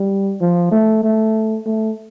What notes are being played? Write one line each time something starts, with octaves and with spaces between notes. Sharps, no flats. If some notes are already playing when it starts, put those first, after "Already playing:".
Already playing: G3
F3
A3
A3
A3